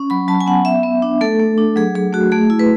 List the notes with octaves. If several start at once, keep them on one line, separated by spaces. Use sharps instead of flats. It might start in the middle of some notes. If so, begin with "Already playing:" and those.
Already playing: C#4
F#3 B5
F#3 A5
G#5
B3 F#5
B3 E5
B3
D4
A3 A4
A3
D4
F#3 G#4
F#3 G#4
A3 F#4
A3 G#4
E4
B4